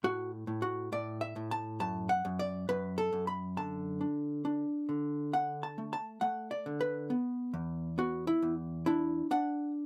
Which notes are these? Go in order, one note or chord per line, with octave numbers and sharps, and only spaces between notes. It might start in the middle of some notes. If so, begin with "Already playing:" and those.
A2 F#4
A2
F#4
A2 D5
E5
A2
A5
F#2 A5
F#5
F#2
D5
F#2 B4
A4
F#2
B5
D3 A5
D4
D4
D3
D4 F#5
A5
A3
A5
A3 F#5
D5
D3
B4
B3
E2
B3 F#4
E4
E2
D4 E4
D4 F#5